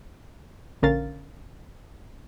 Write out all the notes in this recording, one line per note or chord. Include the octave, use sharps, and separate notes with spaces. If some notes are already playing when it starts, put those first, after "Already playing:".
A#1 D3 C#4 A#4 F5 A6